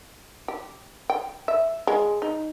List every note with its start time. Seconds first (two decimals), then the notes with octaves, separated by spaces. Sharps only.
0.48 G4
1.10 G5
1.48 E5
1.87 G#3
2.22 D#4